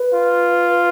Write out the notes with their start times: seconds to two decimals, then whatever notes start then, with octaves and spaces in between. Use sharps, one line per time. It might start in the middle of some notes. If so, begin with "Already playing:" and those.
Already playing: B4
0.13 F4